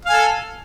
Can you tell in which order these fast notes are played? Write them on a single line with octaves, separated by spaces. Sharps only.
F5 G#5 A4